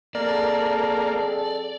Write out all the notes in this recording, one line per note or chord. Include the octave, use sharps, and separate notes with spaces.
F2 A#3 G#4 A4 D5